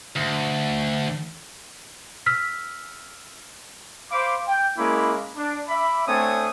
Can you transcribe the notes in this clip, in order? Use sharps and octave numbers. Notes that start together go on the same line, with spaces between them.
D2
E6 F6 B6
C5 F5 B5 D6
G5
G#3 A#3 C#4 E4 B5 D6
D4
E5 B5 D6
A3 C4 D4 C#5 G#5 D#6